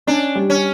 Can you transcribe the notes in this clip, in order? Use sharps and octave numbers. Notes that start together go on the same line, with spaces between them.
C#4 D4
G3
C#4